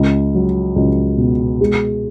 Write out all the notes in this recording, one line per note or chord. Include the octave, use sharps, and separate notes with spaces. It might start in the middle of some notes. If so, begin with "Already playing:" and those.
Already playing: C#2
F#3
C#2
B2
G#3